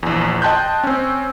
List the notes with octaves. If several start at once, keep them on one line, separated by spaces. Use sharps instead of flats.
A#1 E2
D#5 G5 A5 C6 F#6 G6
C4 C#4